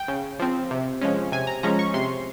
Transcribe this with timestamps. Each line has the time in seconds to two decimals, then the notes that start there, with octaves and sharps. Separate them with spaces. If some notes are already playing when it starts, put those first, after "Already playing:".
Already playing: G5
0.08 C#3
0.39 F3 C4
0.71 C3
1.01 F3 G#3 C#4
1.32 C3 G#5
1.47 A#5
1.63 F3 G#3 C#4 A#5
1.79 C#6
1.94 C3 C6